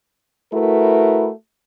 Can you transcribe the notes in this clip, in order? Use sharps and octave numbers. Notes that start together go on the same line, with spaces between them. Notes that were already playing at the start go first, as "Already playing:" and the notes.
A3 E4 F#4 A#4 B4